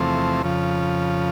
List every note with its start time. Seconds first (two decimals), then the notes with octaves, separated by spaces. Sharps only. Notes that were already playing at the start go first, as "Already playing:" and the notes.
Already playing: E2 C3 F3 A3 C4
0.43 F2 C#3 F3